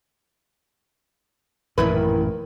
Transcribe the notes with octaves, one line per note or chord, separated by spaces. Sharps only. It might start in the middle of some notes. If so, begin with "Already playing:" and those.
A1 F#2 A#2 D#3 E4 B4